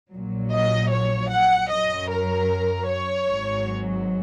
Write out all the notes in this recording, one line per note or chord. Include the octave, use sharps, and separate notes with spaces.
A#1 A#2 F#3
D#5
C#5
F#5
F#2 F#3 D#5
A#4
C#5
G#1 G#2 F#3